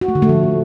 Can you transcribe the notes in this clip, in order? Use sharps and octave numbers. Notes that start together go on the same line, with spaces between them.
F#4
A3
D3
A3
F3